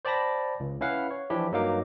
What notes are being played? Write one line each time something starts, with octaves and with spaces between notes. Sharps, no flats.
C5 D5 G5 A5 B5 A#6
C#2
C#4 E4 B4 F5 F#5
C#5
E3 F3 D4 E4 G4
G2 F#3 A#3 D#4 F5 D6